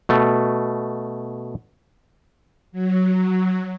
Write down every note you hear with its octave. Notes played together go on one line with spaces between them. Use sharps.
B2 A3
F#3